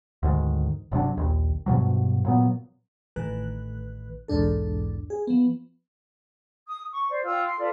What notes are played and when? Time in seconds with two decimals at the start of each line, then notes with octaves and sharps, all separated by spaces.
0.23 D2 G#2 D#3
0.92 G1 C3 F#3 D4
1.17 A#1 D#2
1.66 G2 B2 F3 F#3
2.25 A#2 F#3 B3
3.16 A1 A2 D#3 B4 F#6
4.28 B1 E2 G#2 D4 A4
5.10 G#4
5.27 F3 B3
6.66 D#6
6.90 C#6
7.09 C5 D5
7.24 F4 G5 E6
7.44 C6
7.57 F4 A4 B4 D5